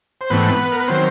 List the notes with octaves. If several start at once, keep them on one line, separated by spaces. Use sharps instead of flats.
C5
G#2 E3 A3 B3 C4 B4
A#4
B4
D#3 F#3 C4 C5